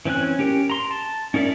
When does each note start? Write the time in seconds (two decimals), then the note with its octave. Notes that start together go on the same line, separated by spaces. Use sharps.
0.05 E3 C4 C#4 G#5 F#6
0.39 C#4 G4 A#4
0.70 A#5 C6
0.91 A5
1.34 C#4 D#4 A#4 D5 E5